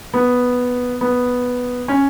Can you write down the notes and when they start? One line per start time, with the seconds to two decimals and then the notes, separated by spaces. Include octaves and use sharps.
0.14 B3
1.01 B3
1.88 C#4